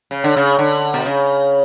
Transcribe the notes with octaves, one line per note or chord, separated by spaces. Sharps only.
C#3
D3
C#3
D3
B2
C#3